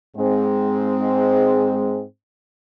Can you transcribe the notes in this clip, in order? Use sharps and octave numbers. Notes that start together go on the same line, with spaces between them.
G#2 G#3 C4